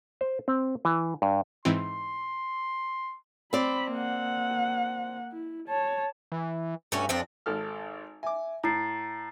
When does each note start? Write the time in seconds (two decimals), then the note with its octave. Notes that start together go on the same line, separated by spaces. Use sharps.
0.21 C5
0.48 C4
0.85 E3
1.22 G2
1.65 G#2 E3 C4 C6
3.53 C4 D5 B5
3.92 A#3 F#5
5.32 E4
5.68 C#5 A5
6.32 E3
6.92 G2 A3 C#4 F#4
7.09 F2 F3 C4 D4
7.46 G#1 A4 F6
8.23 E5 G#5 D6
8.64 A2 A#5 A6 C7